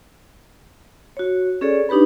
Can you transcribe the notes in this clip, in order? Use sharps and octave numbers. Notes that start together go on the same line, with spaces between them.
F#4 C#5
C#4 G#4 A4 C#5 D5
D4 D#4 G4 B4 B5